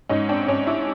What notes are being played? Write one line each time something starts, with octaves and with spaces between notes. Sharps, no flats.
G#2 C#4 D#4
C4 D4
G#2 C#4 D#4
D4 E4